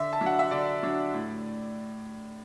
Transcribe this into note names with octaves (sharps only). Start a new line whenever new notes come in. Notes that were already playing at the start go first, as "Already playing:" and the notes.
Already playing: D3 E5
A5
F#3 D4
F#5
E5
D3 D5
F#3 D4
A2